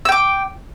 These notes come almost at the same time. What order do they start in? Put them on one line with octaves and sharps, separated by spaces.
E6 G5 D6